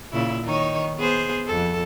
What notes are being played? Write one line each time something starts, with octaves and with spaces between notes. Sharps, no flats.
A#2 C#3 E4
D#3 D#4 C#5
B3 G#4 C5
F2 A4